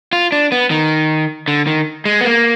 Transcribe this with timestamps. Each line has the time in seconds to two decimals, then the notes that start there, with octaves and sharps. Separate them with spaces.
0.13 F4
0.32 D4
0.52 B3
0.70 D#3
1.48 D3
1.67 D#3
2.05 G#3
2.21 B3
2.25 A#3